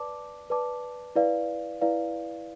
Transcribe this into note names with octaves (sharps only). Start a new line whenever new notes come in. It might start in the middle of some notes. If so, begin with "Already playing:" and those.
Already playing: B4 D5 A5 D6
B4 D5 A5 D6
E4 B4 D5 F5
E4 B4 D5 F5